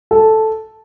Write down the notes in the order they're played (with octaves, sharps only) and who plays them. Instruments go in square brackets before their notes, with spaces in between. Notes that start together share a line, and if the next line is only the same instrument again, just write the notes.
[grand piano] A4